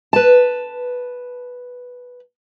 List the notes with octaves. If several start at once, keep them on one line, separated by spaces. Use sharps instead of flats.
B4 A5